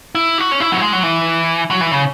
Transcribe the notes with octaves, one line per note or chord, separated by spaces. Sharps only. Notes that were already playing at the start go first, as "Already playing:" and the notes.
E4
F#4
C#4
E4
F#3
G#3
F#3
E3
F#3
E3
C#3